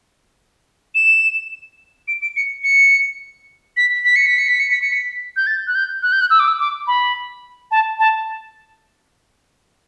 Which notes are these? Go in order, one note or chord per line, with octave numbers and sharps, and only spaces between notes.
E7
D7
D7
C#7
C#7
B6
B6
C#7
B6
C#7
B6
C#7
B6
C#7
B6
G6
A6
F#6
G6
F#6
G6
F#6
E6
D6
E6
D6
B5
A5
A5